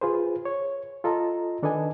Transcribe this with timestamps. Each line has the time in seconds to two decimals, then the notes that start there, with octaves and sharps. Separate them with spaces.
0.01 F4 G#4 B4 C5
0.45 C#5
1.04 F4 A4 D#5 A#5
1.63 D#3 D4 A4 B4 D#5 G#5